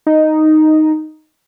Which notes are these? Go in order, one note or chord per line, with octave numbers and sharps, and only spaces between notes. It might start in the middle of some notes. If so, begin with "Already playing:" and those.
D#4